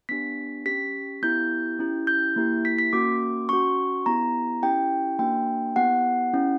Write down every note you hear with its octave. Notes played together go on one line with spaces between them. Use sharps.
B3 D4 G4 B6
C#4 G4 B6
B3 E4 G4 G6
C#4 E4 G4
G6
A#3 E4 G4
B6
B6
A#3 C#4 F#4 D6
C#4 F#4 C#6
B3 E4 G4 A#5
C#4 E4 G4 G5
A#3 D4 F#4 G5
B3 E4 G4 F#5
C#4 E4 G4